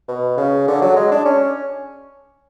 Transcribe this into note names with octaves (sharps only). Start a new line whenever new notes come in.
B2
C#3
D3
F#3
G#3
D4
C#4